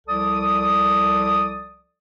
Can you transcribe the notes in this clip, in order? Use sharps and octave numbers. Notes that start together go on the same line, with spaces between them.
C2 F3 A4 D5 D#6